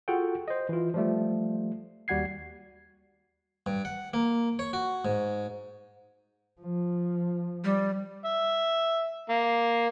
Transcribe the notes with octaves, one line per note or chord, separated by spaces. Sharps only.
F4 F#4 G#4 A4 F#5 G5
C5 D#5
E3 F4
F3 G3 A3
D#2 G3 F#4 F#5 G#6 C7
G2
F#5
A#3
C#5
F#4
G#2
F3
G3
E5
A#3